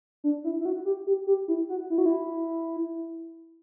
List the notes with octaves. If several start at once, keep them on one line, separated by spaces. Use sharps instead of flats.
D4
E4
E4
F#4
G4
G4
G4
E4
F#4
E4
F#4
E4